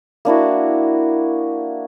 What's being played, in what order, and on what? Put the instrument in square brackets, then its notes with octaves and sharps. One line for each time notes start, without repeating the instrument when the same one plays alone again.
[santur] A#3 D4 E4 F#4